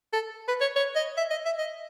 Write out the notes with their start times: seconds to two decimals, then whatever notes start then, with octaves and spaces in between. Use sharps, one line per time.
0.13 A4
0.48 B4
0.61 C#5
0.76 C#5
0.96 D#5
1.17 E5
1.31 D#5
1.46 E5
1.58 D#5